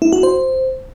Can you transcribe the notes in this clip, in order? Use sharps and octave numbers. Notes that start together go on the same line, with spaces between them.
E4
F#4
C5